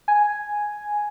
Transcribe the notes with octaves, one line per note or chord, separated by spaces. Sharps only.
G#5